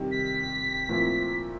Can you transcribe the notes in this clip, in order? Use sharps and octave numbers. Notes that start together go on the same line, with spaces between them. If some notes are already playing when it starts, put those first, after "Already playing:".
Already playing: C3 D#3 G3
B6
A#2 F3 A3 C4 E4